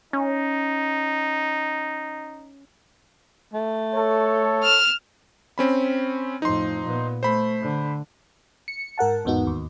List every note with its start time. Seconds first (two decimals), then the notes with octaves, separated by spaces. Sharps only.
0.13 C#4 D#4
3.54 A3
3.93 A4 C#5
4.63 F6 E7
5.58 C4 C#4 B5
6.42 F2 A2 D#4 C6
6.84 A#2 B3
7.23 A3 C5 B5
7.62 D3
8.68 C#7
8.98 G#2 A#4 F#5 A5
9.24 G1 E2 G#2 B3 D#4 F#4
9.47 D#2